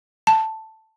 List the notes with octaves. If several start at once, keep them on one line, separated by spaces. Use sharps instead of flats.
A5